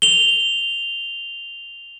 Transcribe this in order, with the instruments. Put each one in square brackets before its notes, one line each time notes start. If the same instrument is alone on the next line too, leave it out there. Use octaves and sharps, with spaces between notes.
[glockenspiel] F7 G7